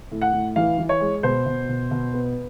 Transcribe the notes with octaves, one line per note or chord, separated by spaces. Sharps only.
A2
F#5
A2
E3 F5
E3
C#5
G#3
B2 C5
B2
B2
B2
B3